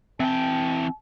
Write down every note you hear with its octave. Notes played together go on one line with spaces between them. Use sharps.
E3 C4 G5 A5